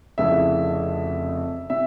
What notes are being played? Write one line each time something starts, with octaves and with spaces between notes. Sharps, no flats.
F1 F2 C#3 E3 E5
C3 E5